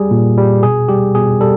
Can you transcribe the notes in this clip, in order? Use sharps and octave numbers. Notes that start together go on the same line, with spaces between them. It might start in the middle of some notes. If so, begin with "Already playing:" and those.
Already playing: G3 G#4
A#2
G3
B2 G#4
G3 G4
B2 G#4
G3 A4